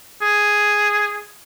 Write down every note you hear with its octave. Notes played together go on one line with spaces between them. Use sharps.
G#4